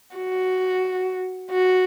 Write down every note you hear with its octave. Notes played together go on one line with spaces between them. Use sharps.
F#4
F#4